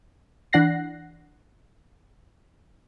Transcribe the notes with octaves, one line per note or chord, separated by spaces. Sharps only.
E3 D4 F#5 F#6 A#6 C7